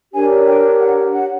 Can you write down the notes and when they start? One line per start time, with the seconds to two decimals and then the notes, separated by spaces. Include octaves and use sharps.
0.13 D4 G4 A#4 C#5 G#5
0.47 G5
0.81 F#5
1.14 F#5